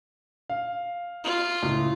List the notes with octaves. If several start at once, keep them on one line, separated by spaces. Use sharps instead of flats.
F5
F4
C#2 A2